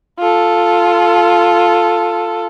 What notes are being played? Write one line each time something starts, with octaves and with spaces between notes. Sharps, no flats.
F4 A4